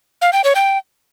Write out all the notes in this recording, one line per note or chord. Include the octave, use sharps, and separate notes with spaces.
F5
G5
C#5
G5